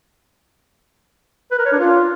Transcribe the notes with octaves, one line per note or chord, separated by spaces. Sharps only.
B4
A#4
C#5
D4
F4